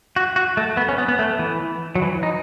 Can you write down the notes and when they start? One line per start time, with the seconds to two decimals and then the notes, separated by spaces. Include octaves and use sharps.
0.16 F#4
0.36 F#4
0.57 A3
0.77 B3
0.89 C#4
0.98 B3
1.08 B3
1.19 A3
1.39 E3
1.95 F#3
2.02 E3
2.23 D#4